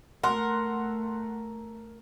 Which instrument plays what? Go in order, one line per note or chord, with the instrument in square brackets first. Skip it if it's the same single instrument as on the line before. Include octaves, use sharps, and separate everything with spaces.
[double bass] A3 [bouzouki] A#4 [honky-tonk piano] F#5 C6